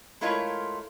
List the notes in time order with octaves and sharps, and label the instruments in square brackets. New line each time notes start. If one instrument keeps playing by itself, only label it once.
[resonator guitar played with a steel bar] G#3 A3 E4 F4 A#4 C#5